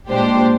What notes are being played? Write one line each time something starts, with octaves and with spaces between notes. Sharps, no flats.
A#2 G#3 D4 G4 C5